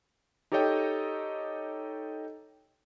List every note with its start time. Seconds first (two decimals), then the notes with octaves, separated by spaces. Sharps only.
0.52 D#4 G4 A4 C#5 D#5 G5